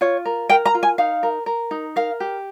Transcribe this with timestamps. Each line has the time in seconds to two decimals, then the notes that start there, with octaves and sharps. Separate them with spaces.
0.01 F4 C#5
0.25 A#4
0.49 A#4 G5
0.66 A#5
0.75 F4
0.83 G#5
0.98 D#4 F5
1.23 A#4
1.46 A#4
1.71 D#4
1.96 A#4 F5
2.20 G4